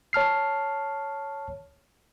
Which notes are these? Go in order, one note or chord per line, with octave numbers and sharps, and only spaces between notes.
C#5 A5 F6 C7